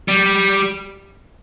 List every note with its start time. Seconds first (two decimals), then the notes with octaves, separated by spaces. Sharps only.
0.08 G3